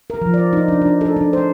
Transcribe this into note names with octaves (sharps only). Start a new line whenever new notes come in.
A#4
F3
D5
D#4
D4
D4
A4
D4
C5